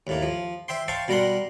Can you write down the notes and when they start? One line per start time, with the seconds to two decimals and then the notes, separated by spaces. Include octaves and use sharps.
0.07 D#2 A2 A#3
0.22 F3
0.68 C5 E5 G5 C6
0.88 C5 F5 G5 A5 C#6
1.08 B2 G3 A#4 F#5 C6